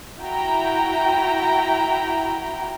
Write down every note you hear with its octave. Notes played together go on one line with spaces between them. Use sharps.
E4 F#4 G5 A#5